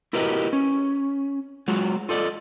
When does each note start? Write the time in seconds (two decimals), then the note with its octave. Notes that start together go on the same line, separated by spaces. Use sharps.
0.13 E4 F#4 G4 A#4 B4 D#5
0.53 C#4
1.68 F#3 G#3 F4 F#4
2.09 F4 A4 D5 D#5